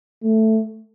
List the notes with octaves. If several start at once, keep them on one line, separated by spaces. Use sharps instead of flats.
A3